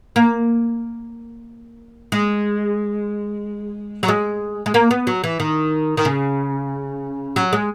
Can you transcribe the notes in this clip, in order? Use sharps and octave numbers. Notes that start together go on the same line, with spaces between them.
A#3
G#3
F#3
G#3
G#3
A#3
B3
F#3
E3
D#3
D#3
C#3
F#3
G#3